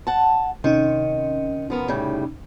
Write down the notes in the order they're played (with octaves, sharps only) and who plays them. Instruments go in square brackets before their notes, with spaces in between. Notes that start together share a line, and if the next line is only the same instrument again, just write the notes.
[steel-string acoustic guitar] F#5 A5
[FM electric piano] C3 C#4 D#4 [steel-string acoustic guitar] D#3
[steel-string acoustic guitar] F3 B3 A#4
A2 C#3 G3